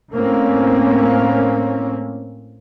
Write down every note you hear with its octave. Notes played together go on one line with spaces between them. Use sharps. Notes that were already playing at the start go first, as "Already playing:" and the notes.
A2 A#3 C4 C#4